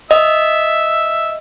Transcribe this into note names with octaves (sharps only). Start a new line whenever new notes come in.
D#5 E5